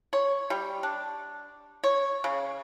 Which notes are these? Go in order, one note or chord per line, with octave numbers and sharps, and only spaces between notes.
C#5
G3
D4
C#5
C#3